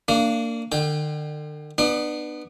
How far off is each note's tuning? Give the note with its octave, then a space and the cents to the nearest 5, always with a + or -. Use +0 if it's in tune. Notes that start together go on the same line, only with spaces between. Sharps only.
A#3 -20 D4 +0
D3 +40 G5 +0
B3 +0 D4 +35